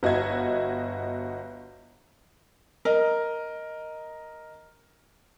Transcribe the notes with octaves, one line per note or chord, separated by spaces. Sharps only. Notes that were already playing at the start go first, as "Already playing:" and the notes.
G1 F#4 D#5 E5 G#6
A#4 D#5